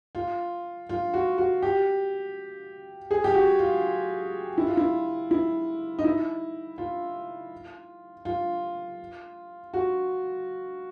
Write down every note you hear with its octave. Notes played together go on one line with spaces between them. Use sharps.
F4
F4
F#4
F#4
G4
G#4
G4
F#4
F4
E4
F4
E4
E4
D#4
E4
F4
F4
F#4